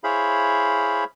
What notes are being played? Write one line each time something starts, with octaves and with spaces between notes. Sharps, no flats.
E4 G#4 C5 C#5 F5 B5